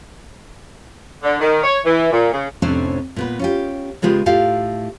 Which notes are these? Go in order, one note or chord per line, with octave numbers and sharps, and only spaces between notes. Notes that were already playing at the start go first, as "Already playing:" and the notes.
D3
D#3
C#5
E3
A#2
C#3
F2 A2 C3 C#4 D4 C5
A#2 B3 B4
C#4 F4 G4
C#3 G#3 B3 F4 G4
A2 F4 G4 F5